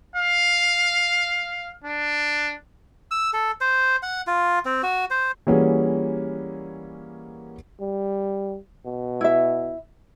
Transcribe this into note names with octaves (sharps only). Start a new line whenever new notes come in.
F5
D4
E6
A4
C5
F#5
F4
C4
F#4
C5
E3 G3 A#3 C#4 F#4 G#4
G3
B2
E4 E5